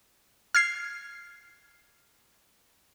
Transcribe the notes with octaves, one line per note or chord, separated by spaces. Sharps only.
F6 G#6 C7